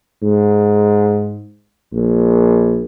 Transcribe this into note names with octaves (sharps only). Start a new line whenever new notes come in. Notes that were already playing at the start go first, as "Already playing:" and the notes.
G#2
A#1